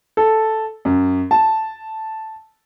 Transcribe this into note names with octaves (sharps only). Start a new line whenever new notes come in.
A4
F#2
A5